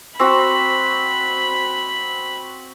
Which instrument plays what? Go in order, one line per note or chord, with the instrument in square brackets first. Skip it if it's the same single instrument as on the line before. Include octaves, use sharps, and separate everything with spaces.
[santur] C4 F#4 [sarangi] B5